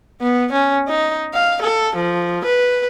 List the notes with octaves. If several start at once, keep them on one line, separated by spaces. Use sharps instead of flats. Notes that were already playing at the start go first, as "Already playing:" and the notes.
B3
C#4
D#4
F5
A4
F3
B4